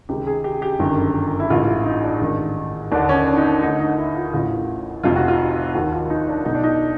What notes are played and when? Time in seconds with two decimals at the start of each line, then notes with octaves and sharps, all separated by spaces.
0.09 C#2 C3 D#3 G4
0.27 G#4
0.44 G4
0.62 G4
0.79 G1 F#2 D#3
1.40 E4
1.50 A1 G#2 E3 F4
1.68 E4
1.85 D#4
2.03 D4
2.21 A1 G#2 D#3
2.92 D#2 D3 D4
3.09 C#4
3.27 D4
3.37 D#4
3.45 D4
3.62 D2 D3 D#4
3.80 D#4
3.98 E4
4.15 F4
4.33 A1 A2 E3 F4
5.03 F1 F2 C3 F4
5.16 F#4
5.28 F4
5.75 D#2 D#3 F#4
5.92 F4
6.10 D#4
6.28 D4
6.45 B1 B2 D#4
6.55 D4
6.64 D#4